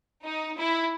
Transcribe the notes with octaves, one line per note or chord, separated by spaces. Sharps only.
D#4
E4